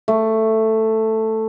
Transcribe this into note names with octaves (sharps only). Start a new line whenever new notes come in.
A3